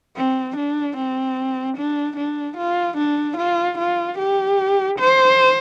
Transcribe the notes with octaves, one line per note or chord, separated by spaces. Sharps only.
C4
D4
C4
D4
D4
F4
D4
F4
F4
G4
C5